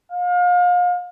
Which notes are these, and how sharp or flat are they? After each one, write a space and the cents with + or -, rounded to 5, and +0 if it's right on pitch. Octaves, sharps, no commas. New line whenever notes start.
F5 +35